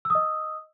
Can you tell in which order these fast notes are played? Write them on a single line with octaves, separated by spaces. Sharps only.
E6 D#6 D#5